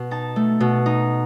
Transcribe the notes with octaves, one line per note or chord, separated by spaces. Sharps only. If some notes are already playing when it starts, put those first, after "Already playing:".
Already playing: B2
D#4 A5
A3
B2
D#4